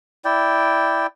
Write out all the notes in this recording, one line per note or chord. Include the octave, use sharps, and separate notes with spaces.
E4 D5 G5